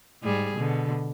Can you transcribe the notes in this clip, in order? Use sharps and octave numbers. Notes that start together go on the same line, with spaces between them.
G#2 G3 G#4
B2 D3